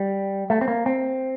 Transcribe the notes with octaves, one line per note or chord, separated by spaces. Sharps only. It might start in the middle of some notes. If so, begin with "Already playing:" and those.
Already playing: G3
A3
C4
A#3
C4